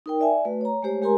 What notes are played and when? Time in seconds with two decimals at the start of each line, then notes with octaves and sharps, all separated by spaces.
0.06 D#4 A#4 G5
0.20 D5 E5 G#5
0.45 A3 F#4 B4
0.61 C#5 A#5
0.83 G#3 A3 G4 C5 C#5
1.02 G#3 G4 A#4 G#5 A#5 C6